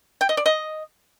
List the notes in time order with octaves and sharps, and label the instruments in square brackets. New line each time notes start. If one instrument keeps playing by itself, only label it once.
[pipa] G5
D#5
D5
D#5